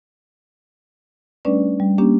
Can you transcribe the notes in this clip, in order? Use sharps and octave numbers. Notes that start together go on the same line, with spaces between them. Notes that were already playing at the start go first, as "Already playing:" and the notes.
G3 A3 C#4 D4 B4 D5
G3
A#3 C#4 D4 G4